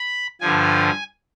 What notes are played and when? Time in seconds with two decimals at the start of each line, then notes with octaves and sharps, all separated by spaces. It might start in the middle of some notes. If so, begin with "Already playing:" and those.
Already playing: B5
0.40 G2 D3 F3 G#5